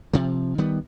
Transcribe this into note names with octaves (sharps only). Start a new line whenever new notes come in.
C3 F3
D#3 G3 B3